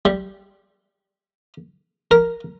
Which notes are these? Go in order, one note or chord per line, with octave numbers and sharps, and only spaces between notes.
G3
A#4